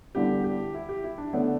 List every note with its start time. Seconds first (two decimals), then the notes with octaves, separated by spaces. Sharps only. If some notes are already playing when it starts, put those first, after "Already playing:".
0.15 D3 G3 B3 E4 G4
0.44 G4
0.74 E4
0.89 G4
1.04 E4
1.18 D4
1.33 D3 A3 B3 D4